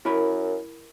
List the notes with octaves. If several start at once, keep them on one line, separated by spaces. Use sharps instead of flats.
F#2 E4 A#4 B5